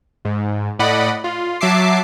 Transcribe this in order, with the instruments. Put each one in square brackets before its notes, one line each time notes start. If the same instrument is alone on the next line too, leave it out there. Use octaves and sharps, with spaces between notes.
[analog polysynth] G#2
A2 D5 D#5 F#5 B5
F4
F#3 E5 A5 D6 C7